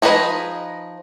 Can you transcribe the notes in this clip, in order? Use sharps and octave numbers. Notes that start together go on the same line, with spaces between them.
F3 D#4 G#4 B4 D#5